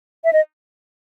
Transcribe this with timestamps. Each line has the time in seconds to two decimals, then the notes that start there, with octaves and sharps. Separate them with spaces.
0.24 E5
0.33 D#5